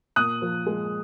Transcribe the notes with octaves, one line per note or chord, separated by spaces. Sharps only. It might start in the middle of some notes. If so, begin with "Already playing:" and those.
A#2 D#6 F#6
F3
G#3